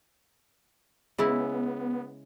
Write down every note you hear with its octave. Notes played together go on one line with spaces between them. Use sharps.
C#3 G#3 B3 E4